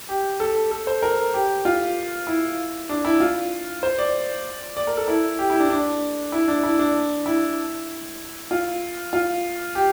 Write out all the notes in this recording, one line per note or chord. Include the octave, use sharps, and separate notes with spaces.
G4
A4
A4
C5
A#4
G4
F4
E4
D4
E4
F4
C5
D5
D5
A#4
A4
E4
G4
E4
D4
D4
E4
D4
E4
D4
E4
F4
F4
G4